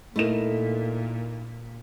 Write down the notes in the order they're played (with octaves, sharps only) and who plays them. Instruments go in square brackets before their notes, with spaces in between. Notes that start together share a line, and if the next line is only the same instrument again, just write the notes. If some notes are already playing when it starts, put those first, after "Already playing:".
[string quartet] A#2 [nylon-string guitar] A3 D#4 A#4 [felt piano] E4 E7